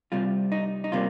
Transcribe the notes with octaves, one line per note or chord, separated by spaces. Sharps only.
C2 C3 G3 F4
D#4
D#4
C3 G3 A#3 F4